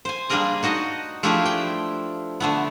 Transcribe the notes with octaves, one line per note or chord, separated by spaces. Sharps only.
C5 G#5
G3 A#3 D4 G#4 A#4 D#5
D#4 F#4 D#5 A5
F3 A3 D4 E4 G4 G#4
G5
D3 A3 B3